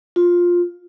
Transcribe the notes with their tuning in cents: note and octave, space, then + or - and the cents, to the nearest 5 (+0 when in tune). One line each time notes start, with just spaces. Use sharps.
F4 +10